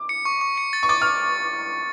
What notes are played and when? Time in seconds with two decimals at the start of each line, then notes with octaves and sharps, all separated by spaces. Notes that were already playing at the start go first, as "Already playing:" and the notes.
Already playing: D6
0.09 C#7
0.25 C#6
0.41 C#6
0.57 C#7
0.73 A6
0.83 C#6
0.89 D6 A6
1.02 F6